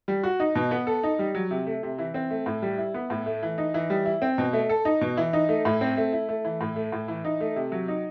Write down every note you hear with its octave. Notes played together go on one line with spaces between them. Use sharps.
G3
F#4
D#4
B2
B3
A4
D#4
G3
F#3
C3
A3
C3
E3
C4
A3
A2
G3
E4
B3
A2
A3
E3
D#4
E3
G3
E4
C4
B2
A3
A4
D#4
B2
E3
D#4
A3
A2
C4
A3
E4
A3
E3
A2
A3
A2
E3
D#4
A3
C3
F#3
D#4